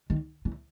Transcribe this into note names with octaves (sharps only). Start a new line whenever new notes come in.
D#3
E3